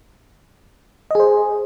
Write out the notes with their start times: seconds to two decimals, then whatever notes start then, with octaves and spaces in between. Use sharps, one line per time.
1.11 D#5
1.15 G#4
1.20 C5